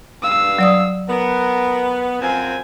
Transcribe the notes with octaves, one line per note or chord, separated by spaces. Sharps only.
G2 F5 E6
F#3 D5 D#6
B3 A#4
F#2 F3 C4 G#5